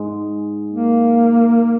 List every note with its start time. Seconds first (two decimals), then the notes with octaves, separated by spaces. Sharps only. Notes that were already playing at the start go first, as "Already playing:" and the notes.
Already playing: G#2 G#3
0.71 A#3